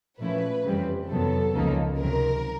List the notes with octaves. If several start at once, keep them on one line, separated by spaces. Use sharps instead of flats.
A#2 F3 A3 C#4 E4 B4
F2 C#3 E3 G3 C4
F2 C3 D#3 F#3 B3 A4
C#2 C#3 F3 A#3 D#4
C#2 C3 D#3 F#3 A#4